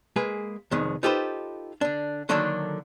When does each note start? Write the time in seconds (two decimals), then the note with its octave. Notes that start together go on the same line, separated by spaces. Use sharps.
0.16 G#3 A#3 G#4 B4
0.71 C2 F2 D#3 G#3 B3
1.03 D#4 F4 G4 A4 B4 C5
1.81 D3 D4
2.29 D3 D#3 F#3 A#3 D4 A4